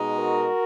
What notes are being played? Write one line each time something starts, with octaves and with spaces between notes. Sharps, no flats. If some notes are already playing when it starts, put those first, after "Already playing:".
Already playing: B2 G#3 D#4
F#4 A#4